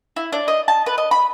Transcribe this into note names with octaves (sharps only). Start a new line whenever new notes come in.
E4
D4
D#5
A5
B4
D#5
B5